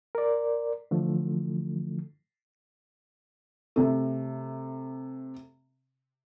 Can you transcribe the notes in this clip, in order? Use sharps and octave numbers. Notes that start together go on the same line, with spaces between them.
A#4 D5
D3 E3 F3 A3
C3 A3